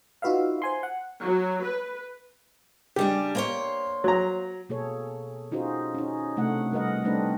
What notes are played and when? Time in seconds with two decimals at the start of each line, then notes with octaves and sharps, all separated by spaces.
0.22 D#4 F4 F#4 B4 E5 F5
0.62 C5 G#5 C6
0.83 F#5
1.21 F#3
1.64 B4
2.96 C#3 G3 D4 G4
3.35 A#3 C5 C#5
4.04 F#3 A#5
4.69 B2 A#3 G#4 A4 C#5
5.51 C#4 D#4 F4 F#4 G#4 C5
5.94 C#4 D#4
6.37 C3 A3 D4 F#5
6.72 G3 A#4 B4 D#5 F#5
7.04 G3 A3 C4 D4 D#4 B4